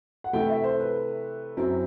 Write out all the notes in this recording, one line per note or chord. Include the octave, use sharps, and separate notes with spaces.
F#5
C3 E3 A3 E4 G5
E5
C5
B4
F#2 F#3 C4 E4